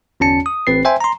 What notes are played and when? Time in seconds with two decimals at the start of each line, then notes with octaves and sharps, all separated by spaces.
0.20 G1 E2 C#4 A5 C#7
0.46 D#6
0.67 A1 C4 B4 C7
0.85 C5 E5 G5 G#5 C6
1.00 A#5 C6